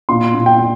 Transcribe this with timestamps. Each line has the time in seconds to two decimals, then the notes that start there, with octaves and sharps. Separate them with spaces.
0.09 A#2 C6
0.34 A#2
0.46 G5
0.58 A#2